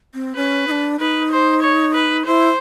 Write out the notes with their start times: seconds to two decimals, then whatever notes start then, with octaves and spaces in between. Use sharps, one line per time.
0.14 C4
0.35 C#4 B4
0.67 D#4
0.71 D4
0.99 D#4 B4
1.31 C5
1.63 C#5
1.94 B4
2.25 E4 C5